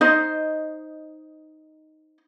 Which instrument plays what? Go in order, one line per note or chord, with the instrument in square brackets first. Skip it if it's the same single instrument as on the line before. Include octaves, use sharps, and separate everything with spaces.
[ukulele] D#4 C5 D#5